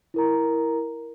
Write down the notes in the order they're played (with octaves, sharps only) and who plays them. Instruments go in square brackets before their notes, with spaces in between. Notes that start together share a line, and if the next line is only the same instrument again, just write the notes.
[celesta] E4 A#4 A#5